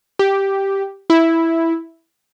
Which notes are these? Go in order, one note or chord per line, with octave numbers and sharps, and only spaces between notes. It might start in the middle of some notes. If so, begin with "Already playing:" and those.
G4
E4